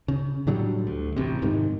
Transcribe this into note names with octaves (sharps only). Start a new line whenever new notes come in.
C#3
A2 D3 F#3 G3
D2
A1 C3
F2 G#2 C3 D#3